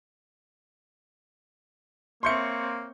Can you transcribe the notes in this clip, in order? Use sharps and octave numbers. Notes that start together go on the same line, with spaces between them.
A#3 C4 C#5 E5 C6 C#6 G6 C#7